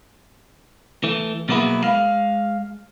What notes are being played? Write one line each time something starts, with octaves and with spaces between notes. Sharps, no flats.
E3 A3
B2 F#3 A#3 B3 E4 G#4
G#3 F5